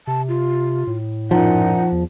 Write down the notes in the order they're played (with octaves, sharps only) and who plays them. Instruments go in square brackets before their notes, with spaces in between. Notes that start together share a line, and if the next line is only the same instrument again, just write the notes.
[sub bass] C3 [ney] A5
[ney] F4
[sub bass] A2
[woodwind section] F#2 A#2 D#4 [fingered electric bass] F3 [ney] F#5
[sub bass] E2